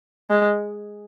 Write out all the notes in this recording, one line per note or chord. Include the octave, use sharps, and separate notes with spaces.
G#3